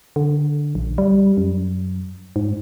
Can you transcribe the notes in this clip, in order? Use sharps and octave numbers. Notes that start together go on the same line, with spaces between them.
D3
A#1
G3
F#2
G#2